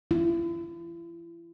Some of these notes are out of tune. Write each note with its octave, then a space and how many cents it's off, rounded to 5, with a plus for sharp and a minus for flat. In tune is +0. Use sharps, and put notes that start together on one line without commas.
E4 +40